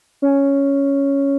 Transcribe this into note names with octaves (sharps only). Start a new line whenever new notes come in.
C#4